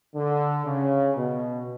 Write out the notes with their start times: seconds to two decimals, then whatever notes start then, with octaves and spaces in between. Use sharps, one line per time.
0.15 D3
0.66 C#3
1.17 B2